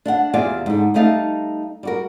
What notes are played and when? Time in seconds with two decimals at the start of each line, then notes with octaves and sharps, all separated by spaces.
0.06 D4 F5 F#5
0.34 E2 C3 F4 D5 F5 G#5
0.66 G#2 D3
0.94 G3 A3 D#4 F5 A5
1.83 G3 F#4 A#4